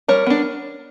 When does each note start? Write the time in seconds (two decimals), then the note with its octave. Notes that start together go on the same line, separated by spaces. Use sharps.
0.08 G3 A#4 C#5
0.27 B3 D4